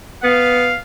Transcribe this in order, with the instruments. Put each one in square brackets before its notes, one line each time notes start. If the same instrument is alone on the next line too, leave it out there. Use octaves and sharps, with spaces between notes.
[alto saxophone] B3 [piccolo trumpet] F5